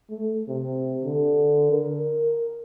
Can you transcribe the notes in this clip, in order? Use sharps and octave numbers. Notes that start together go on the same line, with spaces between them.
A3
C3
D3
A#4